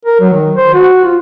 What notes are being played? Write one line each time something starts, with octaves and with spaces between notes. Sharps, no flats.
A#4
F#3
D#3
C5
F#4
F4